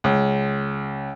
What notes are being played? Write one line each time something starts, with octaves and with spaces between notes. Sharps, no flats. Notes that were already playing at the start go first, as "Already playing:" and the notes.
C#2